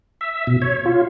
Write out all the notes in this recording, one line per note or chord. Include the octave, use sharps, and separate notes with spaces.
E5
B2
C#5
F4